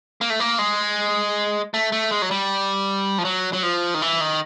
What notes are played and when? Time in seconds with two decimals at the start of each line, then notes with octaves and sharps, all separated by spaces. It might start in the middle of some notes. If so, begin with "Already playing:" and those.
0.21 A#3
0.30 A3
0.40 A#3
0.59 G#3
1.74 A3
1.92 A3
2.11 G#3
2.22 F#3
2.31 G3
3.18 F3
3.25 F#3
3.53 F#3
3.63 F3
3.94 D#3
4.02 E3
4.21 D#3